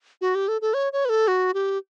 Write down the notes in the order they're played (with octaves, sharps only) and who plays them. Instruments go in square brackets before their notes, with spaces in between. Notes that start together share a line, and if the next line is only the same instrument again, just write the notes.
[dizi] F#4
G4
A4
A4
C#5
C#5
B4
A4
F#4
G4